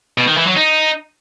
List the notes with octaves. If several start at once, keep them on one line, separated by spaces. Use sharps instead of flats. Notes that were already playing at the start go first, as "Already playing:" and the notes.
B2
D#3
E3
F#3
D#4